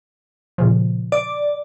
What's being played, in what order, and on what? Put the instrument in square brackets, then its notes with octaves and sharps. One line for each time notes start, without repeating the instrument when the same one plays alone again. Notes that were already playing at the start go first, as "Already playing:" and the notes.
[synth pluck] A#2 C#3 F3
[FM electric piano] D5 [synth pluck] D7